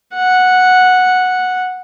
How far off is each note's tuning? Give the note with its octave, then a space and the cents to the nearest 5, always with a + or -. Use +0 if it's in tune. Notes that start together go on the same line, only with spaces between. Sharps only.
F#5 -5